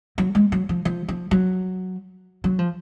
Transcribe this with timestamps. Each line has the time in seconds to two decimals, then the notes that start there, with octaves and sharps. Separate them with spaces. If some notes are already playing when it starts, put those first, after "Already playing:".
0.18 F#3
0.35 G#3
0.52 F#3
0.69 F3
0.85 F3
1.08 F3
1.31 F#3
2.44 F#3
2.59 F3